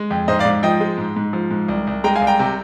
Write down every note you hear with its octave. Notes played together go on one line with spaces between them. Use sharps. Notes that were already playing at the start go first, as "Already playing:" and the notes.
Already playing: G#3
F2
G#2 C5 D#5
D5 F5
G#2
F3 D#5 G5
G#3
G#2
G#2
F3
G#2
C2
C2
G#3 G5 A#5
F5 G#5
C2
G5 A#5
C3